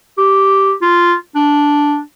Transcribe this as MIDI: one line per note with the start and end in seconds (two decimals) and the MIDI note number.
0.18 0.73 67
0.82 1.15 65
1.35 2.00 62